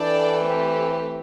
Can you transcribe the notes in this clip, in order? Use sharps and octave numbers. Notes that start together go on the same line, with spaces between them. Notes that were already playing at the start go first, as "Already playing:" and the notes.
Already playing: E3 D4 A4 D5 G5
A3 C4 G4